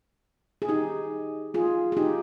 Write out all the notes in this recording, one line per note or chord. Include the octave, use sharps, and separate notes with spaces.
G#4
D#4 G4
F4 G#4
G#4
D#4 G4